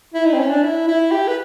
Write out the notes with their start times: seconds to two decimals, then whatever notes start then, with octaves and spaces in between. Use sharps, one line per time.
0.14 E4
0.26 D#4
0.34 C4
0.39 C#4
0.50 D4
0.63 E4
0.88 E4
1.12 G4
1.28 B4